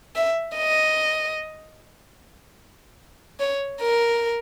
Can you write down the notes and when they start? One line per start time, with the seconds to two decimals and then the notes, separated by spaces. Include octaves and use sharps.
0.16 E5
0.56 D#5
3.40 C#5
3.80 A#4